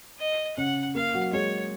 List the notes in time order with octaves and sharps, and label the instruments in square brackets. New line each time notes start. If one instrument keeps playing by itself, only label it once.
[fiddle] D#5
[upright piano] C#3 C#4 [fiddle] F#5
[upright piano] A#3 [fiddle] F5
[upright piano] F#3 F#4
[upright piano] G#3 G#4 [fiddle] C#5